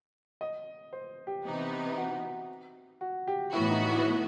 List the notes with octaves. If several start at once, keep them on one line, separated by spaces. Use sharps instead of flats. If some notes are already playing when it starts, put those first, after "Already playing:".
D#5
C5
G4
C3 E3 B3 D#4
F#4
F#4
G4
A2 E3 B3 E4 F#4
D#4
E4